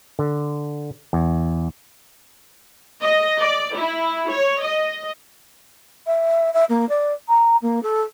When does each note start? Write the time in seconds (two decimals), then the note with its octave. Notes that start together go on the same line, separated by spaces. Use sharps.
0.19 D3
1.13 E2
3.02 D#5
3.40 D5
3.78 E4
4.31 C#5
4.63 D#5
6.06 E5
6.53 E5
6.69 A#3
6.89 D5
7.28 A#5
7.62 A#3
7.83 A4